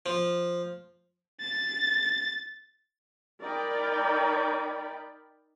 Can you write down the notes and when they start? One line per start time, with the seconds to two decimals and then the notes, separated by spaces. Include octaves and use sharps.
0.06 F3
1.40 A6
3.41 D#4 A#4 D5 G5 B5